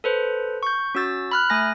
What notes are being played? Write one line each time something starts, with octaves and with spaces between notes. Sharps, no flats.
A4 B4 C5
C#6 G6
C#4 F#4 E6 A6
B5 F6 F#6
A3 G#5 A#6